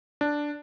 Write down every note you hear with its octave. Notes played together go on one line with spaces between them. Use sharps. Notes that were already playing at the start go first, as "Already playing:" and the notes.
D4